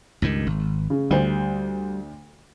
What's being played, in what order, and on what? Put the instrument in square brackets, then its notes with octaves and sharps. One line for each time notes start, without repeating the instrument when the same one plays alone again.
[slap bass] C#2 G2 D#3
G#1
[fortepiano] C#3
[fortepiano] D2 C5 [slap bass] G3